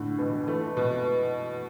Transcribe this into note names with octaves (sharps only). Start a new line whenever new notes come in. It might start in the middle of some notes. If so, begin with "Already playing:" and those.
Already playing: A2 D3
B2 E3
E3 A3
B2